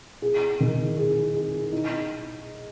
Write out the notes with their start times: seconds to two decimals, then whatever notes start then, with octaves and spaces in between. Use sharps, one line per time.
0.22 G#4
0.60 D#3
0.98 G#4
1.35 G#4
1.73 D#4